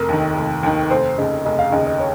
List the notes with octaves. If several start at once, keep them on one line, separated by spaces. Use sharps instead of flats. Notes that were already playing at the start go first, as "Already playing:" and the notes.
Already playing: F1 A#4
D#2 D#3
F1
D#2 D#3
F1 C5
D#2 C#3 D#5
F1 D#5
F5
D#2 C#3 D#5
D#5
C#5